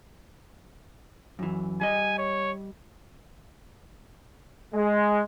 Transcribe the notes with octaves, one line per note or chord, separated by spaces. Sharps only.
F#2 E3
G3 D#5 G#5
C#5
G#3